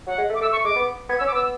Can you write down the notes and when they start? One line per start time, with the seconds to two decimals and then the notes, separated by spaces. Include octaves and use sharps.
0.07 F#3 F#5
0.18 G#3
0.30 A3
0.35 D6
0.41 A3 E6
0.52 A3 C#6
0.64 G#3 D6
0.76 B3
1.09 B3 G#6
1.19 C#4 E6
1.27 D6
1.32 B3 E6